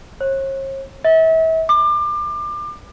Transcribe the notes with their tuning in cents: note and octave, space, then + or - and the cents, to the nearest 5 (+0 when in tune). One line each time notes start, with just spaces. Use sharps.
C#5 -45
E5 -35
D6 +30